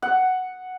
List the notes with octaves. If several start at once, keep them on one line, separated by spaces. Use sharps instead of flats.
F#5